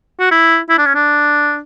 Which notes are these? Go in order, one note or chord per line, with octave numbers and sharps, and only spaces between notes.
F#4
E4
E4
D4
C#4
D4